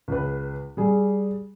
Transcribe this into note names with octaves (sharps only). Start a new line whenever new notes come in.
C#2 B4
G3 G#4